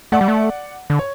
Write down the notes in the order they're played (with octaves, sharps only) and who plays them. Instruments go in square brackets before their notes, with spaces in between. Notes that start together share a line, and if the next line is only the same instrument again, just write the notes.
[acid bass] A3 [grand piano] D5 F#5
[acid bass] G3
A3
D3
[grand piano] C#5